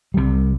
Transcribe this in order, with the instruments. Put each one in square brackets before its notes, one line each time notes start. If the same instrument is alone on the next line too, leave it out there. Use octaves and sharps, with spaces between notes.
[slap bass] C2 C3 G3